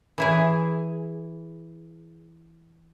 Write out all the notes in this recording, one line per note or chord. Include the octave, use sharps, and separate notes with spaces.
E3 E4 G#4